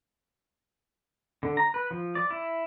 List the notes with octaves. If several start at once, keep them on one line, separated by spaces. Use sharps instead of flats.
D3
A#5
B4
F3
D5
E4